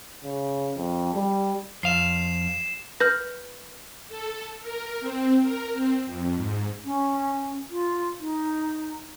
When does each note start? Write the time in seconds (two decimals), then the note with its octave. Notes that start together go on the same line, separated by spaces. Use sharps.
0.24 C#3
0.76 F2
1.15 G3
1.83 F2 F5 C7 E7
3.00 B4 F6 G6 A#6
4.09 A4
4.61 A#4
5.00 C4
5.42 A#4
5.74 C4
6.06 F2
6.36 G#2
6.85 C#4
7.70 F4
8.20 D#4